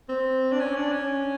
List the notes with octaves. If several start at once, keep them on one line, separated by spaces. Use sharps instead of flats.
C4
D4
C#4
D4
C#4